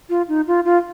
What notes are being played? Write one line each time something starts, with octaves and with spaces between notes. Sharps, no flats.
F4
D#4
F4
F4